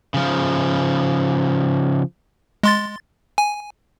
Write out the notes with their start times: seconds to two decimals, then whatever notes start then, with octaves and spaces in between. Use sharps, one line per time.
0.14 C#3 F3
2.63 G#3 C6 A6
3.38 G#5